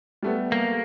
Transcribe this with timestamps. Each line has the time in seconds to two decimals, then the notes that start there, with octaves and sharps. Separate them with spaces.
0.23 G3 A3 B3
0.52 A#3